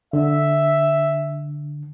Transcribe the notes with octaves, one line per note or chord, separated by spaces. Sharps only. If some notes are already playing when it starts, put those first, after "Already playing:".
D3 E5